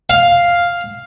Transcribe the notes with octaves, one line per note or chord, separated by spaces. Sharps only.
F5